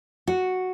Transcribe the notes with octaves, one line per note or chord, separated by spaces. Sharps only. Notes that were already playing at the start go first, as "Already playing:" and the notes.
F#4